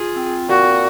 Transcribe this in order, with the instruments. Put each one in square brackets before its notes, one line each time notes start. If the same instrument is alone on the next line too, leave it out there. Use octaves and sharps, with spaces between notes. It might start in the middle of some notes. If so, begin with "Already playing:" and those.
Already playing: [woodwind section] F4 [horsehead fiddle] G#4
[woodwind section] C4
[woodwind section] A#2 [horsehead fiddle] F#4